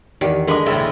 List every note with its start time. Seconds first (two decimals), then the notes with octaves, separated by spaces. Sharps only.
0.21 E2 D#3 G4
0.47 D3 G#3 A#4 B4 D#5
0.66 A#1 D#2 C#3 E4